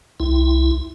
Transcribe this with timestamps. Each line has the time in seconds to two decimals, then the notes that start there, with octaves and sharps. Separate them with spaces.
0.20 C2 E4